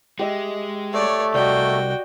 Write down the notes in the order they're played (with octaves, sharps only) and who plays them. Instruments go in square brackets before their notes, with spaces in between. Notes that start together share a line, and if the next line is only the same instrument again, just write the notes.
[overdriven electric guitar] G#3 [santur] G4 D#5 E5
[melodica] A3 [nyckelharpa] C#5 D5
[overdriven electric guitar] C2 [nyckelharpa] F#4 G5 [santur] D5 D#5